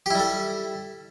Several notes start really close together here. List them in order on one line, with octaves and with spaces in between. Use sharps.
G4 E4 G3 A4